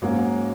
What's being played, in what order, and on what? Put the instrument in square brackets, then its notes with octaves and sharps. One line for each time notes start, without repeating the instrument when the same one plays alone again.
[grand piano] G#2 F#3 A#3 C#4 F#4